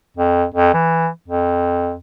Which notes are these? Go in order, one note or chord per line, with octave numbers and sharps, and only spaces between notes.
F2
F2
E3
F2